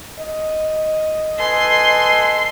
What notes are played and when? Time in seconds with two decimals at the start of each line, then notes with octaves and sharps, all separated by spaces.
0.19 D#5
1.39 A4 B4 G#5 C6